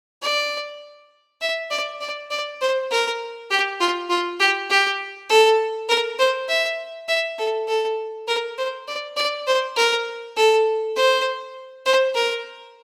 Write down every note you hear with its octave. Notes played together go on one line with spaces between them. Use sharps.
D5
E5
D5
D5
D5
C5
A#4
G4
F4
F4
G4
G4
A4
A#4
C5
E5
E5
A4
A4
A#4
C5
D5
D5
C5
A#4
A4
C5
C5
A#4